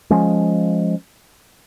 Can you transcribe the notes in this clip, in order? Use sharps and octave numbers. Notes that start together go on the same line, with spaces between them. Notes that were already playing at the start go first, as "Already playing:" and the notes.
F3 G#3 C#4